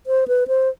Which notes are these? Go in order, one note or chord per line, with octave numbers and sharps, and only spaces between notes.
C5
B4
C5